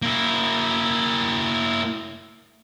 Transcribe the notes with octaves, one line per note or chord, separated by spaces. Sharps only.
A#3 E4